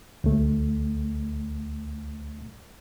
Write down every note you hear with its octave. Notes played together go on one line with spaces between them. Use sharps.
D2 A3